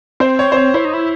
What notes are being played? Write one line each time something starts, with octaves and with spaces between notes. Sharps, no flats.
C4 C5
C#5
C5
C#5
E4 C5
D#4
E4